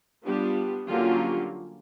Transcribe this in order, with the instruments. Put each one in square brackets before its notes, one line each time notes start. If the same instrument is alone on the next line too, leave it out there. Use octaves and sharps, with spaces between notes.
[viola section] G3 B3 D4 F4 G4
D3 F#3 A#3 C#4 F4 G4